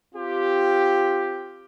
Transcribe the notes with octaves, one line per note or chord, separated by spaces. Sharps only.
C4 F4 G4